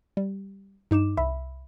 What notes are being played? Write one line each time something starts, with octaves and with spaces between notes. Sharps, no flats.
G3
G2 D#4 D6 E7
C2 E5 B5